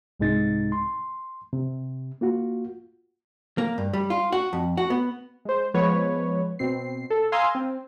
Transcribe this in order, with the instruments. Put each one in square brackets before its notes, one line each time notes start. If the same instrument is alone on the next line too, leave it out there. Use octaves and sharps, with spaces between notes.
[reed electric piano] C2 G#2 C3 G#3 D#4 A6
C6
C3
A#3 F4 F#4
[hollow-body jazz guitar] A#3
G2
G3
F4
F#4
F2
F#4
B3
[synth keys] G#3 C5
F3 G#3 B3 B4 C#5
B2 C4 C7
A4
F5 G#5 A#5 C6 D#6 E6
C4